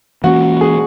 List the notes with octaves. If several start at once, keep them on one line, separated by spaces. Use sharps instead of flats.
E3 A#3 C#4 F#4
G#4